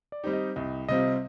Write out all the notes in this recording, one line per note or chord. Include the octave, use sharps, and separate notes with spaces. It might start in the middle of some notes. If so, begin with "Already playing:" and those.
D5
G3 C4 D#4 G4
D#5
C2 D#5
C3 G3 C4 F4 D#5